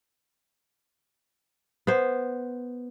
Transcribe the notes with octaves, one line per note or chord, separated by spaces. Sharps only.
B3 C5